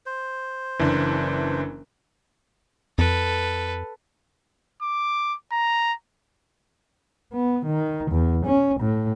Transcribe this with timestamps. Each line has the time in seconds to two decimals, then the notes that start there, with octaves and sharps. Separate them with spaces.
0.06 C5
0.80 F#1 E3 D4
2.98 F2 A4 B4
4.82 D6
5.52 A#5
7.33 B3
7.66 D#3
8.11 E2
8.46 C#4
8.81 A2